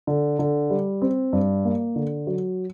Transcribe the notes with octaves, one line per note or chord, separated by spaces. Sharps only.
D3
D3
G3
C4
G2
A#3
D3
F#3